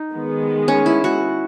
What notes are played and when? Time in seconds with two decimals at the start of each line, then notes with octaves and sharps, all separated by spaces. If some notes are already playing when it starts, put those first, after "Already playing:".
Already playing: D#4
0.12 D#3 G#3 B3
0.68 C#4
0.86 E4
1.04 F#4